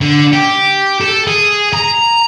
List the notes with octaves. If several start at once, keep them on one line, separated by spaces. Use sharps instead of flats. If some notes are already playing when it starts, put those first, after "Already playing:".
D3
G4
A4
G#4
A#5